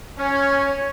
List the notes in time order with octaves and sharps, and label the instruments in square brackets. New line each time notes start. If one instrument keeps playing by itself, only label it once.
[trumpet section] C#4 [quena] C#5